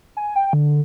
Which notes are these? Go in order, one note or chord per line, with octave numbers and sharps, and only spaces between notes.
G#5
G5
D3